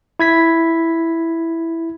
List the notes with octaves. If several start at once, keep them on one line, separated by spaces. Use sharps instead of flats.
E4 G#6 B6